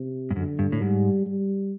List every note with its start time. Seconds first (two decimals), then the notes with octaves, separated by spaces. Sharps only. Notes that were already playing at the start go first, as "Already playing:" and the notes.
Already playing: C3
0.30 G2
0.36 F#2 D3
0.59 G2
0.72 A2
0.81 G#2 G3
1.26 G3